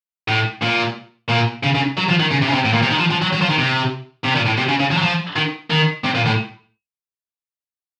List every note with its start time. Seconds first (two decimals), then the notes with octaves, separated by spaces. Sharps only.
0.28 A2
0.62 A#2
1.29 A#2
1.64 C#3
1.75 C#3
1.97 F#3
2.09 F3
2.20 D#3
2.31 C#3
2.42 C3
2.48 C#3
2.54 C3
2.65 A2
2.73 A#2
2.82 C3
2.91 D#3
2.99 F3
3.11 F3
3.22 F#3
3.33 F#3
3.41 F3
3.50 D#3
3.58 C3
4.24 C3
4.35 A#2
4.46 A2
4.57 C3
4.69 C#3
4.80 C#3
4.91 F3
4.97 F#3
5.02 F3
5.36 D#3
5.70 D#3
6.04 C3
6.15 A#2
6.26 A2